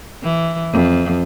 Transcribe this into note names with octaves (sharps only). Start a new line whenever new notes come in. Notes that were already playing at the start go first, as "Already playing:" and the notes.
E3
F2